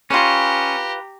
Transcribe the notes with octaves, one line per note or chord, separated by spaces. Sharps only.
C#4 F4 G4 B4 A#5